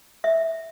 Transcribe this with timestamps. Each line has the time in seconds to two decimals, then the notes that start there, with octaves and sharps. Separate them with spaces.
0.24 E5